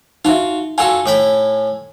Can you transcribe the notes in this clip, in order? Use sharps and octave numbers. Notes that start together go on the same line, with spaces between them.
D#4 F4 F#4 E5
F4 F#4 A4 G#5
A2 G5 B5